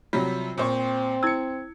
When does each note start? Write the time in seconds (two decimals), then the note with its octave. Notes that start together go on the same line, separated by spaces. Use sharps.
0.13 C3 F#3 G3 F4
0.58 A#2 C4 C5 C#6
1.23 E4 E6 G#6 C#7